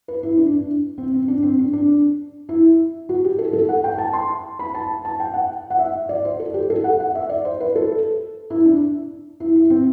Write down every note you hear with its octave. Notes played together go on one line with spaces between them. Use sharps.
B4
E4
D4
D4
C4
C4
D4
C4
D4
D4
E4
F#4
G4
A4
A4
F#5
G5
A5
C6
B5
A5
A5
G5
F#5
F#5
E5
D5
C5
A4
G4
A4
F#5
F#5
E5
D5
C5
B4
A4
E4
D4
E4
E4
C4